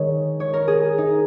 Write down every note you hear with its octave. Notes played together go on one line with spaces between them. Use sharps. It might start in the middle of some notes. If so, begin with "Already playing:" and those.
Already playing: D#3 G#3 C#5
C#5
A#4
G#4
D#4